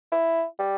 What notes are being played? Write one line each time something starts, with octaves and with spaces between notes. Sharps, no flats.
E4
G3